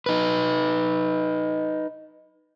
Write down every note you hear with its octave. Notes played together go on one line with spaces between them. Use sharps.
D#4 B4